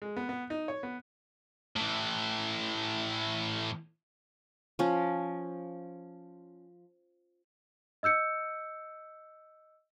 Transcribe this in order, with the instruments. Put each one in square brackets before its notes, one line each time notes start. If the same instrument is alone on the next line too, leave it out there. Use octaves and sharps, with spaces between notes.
[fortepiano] G#3
B3
B3
D#4
C#5
B3
[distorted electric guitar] A2 E3
[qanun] F3 C#4
[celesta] D#5 E6 G6 C#7